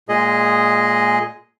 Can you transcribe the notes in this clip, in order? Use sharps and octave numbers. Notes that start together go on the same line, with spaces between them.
A#2 G#3 G#4 D#5